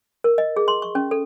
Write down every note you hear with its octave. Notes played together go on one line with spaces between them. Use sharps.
A#4
D#5
G#4
C6
C#6
C#4
A4